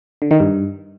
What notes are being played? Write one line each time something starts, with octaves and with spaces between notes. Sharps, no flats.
D3
D#3
G2